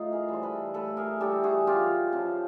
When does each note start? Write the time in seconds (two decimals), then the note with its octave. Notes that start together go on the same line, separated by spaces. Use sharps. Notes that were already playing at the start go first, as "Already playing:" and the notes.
Already playing: A2 D#4 F4
0.12 G#4 A#4
0.28 E3 G3
0.33 C5
0.43 A4 B4
0.74 A2 A4 B4
0.97 G#4 A#4
1.20 E3 G3 G4 A4
1.43 F#4 G#4
1.66 F#2 F4 G4
2.12 C#3 F3